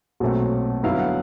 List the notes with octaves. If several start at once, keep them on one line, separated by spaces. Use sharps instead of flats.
B1 A#2 F#3 A3 C4
G2 D3 F#3 B3 E4 F5
F#5